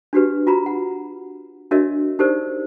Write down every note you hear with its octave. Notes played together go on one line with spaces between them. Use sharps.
D4 F#4 G4 B4
F4 F#4 A#5 B5
F#5
D4 F#4 A#4 C#5 D#5 E5
D#4 G4 A4 A#4 C5 D5